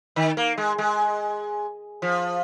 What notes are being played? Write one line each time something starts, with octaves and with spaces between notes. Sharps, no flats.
D#3
A#3
G#3
G#3
F3